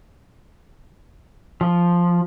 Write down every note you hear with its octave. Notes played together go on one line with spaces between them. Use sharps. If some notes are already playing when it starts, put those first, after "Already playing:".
F3